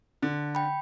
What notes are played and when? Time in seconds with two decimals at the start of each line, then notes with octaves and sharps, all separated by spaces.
0.22 D3
0.55 G5 B5